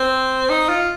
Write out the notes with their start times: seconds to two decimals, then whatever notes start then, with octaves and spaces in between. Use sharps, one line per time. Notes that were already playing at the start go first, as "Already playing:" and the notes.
Already playing: C4
0.50 D#4
0.69 F4